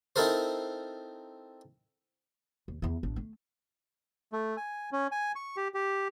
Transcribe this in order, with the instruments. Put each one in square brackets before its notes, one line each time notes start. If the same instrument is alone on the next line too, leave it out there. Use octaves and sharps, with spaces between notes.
[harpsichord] C4 D#4 E4 A4 A#4 C5
[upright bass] D#2
E2 E4
A1 D4
A3
[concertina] A3
G#5
C#4
G#5
C#6
G4
G4